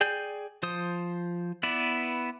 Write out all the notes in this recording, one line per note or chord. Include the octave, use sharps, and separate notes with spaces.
G#4 D5 G5 G#5 G6
F3 C5 D#6
B3 E4 B4 D5